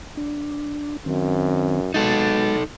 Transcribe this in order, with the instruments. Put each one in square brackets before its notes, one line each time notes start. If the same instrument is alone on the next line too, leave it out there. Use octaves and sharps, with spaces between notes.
[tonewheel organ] D4
[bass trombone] F#2 [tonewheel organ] D#3 C4
[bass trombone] B2 [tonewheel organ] G#3 A6 [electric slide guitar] D#4 A4